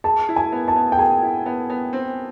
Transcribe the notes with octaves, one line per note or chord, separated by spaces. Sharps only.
G#4 A5
E4
G#5
B3
A5
B3
G5
G#4 G#5
E4
B3
B3
C4